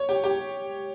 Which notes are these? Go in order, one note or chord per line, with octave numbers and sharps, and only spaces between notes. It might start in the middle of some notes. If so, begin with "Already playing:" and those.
Already playing: C#5
G4
G4